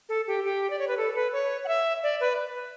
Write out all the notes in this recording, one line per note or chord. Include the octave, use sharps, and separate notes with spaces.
A4
G4
G4
D5
C#5
B4
A4
B4
C#5
F#5
E5
D5
B4